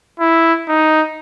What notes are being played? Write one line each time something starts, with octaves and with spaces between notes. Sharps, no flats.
E4
D#4